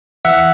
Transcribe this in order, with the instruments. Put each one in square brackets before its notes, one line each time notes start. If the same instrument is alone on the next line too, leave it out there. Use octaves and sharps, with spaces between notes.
[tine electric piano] E3 E5 F#5